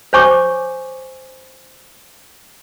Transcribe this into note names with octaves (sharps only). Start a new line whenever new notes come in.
C5 C#5 G#5 C#6 D6